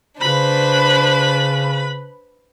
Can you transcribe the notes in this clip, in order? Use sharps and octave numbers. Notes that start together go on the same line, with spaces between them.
C#3 D4 B4 C5 B5